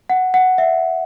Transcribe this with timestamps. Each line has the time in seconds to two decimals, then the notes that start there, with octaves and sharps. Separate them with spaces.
0.10 F#5
0.34 F#5
0.58 E5